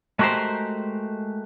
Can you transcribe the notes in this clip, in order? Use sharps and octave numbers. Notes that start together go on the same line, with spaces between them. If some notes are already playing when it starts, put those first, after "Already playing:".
G#3 A3 F#4 G4 A#4 C5